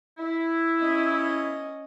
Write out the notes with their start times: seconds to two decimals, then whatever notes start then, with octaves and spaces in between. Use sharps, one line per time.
0.18 E4
0.79 C#4 D#5